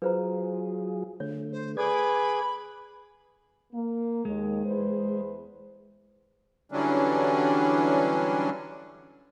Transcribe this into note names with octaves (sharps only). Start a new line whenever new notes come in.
F#3 F4 G#4 B4 C5 A#5
D3 A3 C#5
C5
G#4 A4 B4 D5 B5 D6 G#6
A#3
D#2 G#3
E2 B4 C5
D3 E3 F#3 G3 C#4 D4